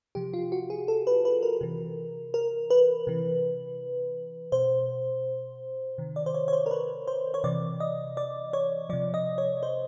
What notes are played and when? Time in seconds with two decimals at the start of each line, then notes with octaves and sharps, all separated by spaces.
0.15 C3 F3 G4
0.33 F4
0.52 F#4
0.70 G#4
0.88 A4
1.07 B4
1.25 B4
1.43 A#4
1.61 C3 E3
2.34 A#4
2.70 B4
3.07 C3 E3
4.52 B2 C5
5.98 C3 D#3
6.16 D5
6.26 C5
6.34 C#5
6.48 C#5
6.53 C5
6.66 A#4
6.71 B4
7.07 C5
7.34 C#5
7.44 C3 E3 D5
7.80 D#5
8.17 D5
8.53 C#5
8.89 C3 F3 D5
9.14 D#5
9.38 C#5
9.63 C5